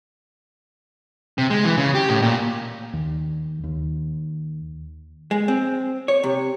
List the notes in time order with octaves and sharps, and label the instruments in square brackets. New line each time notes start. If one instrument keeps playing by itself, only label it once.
[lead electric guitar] C3
G#3
E3
C#3
G4
A2
A#2
[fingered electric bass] D#2
D#2
[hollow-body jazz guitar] G#3
C4
C#5
C3